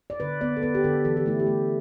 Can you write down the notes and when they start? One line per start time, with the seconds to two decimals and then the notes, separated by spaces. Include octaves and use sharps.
0.10 D5
0.20 D3 B4
0.41 B3 D5
0.57 A4
0.62 B3 B4
0.75 G4
0.84 D3 A4
1.05 E3 A4
1.17 G4
1.26 A3 E4
1.40 G4
1.47 A3